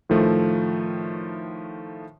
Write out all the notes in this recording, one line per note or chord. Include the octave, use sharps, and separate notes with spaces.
A2 D#3 F3 A3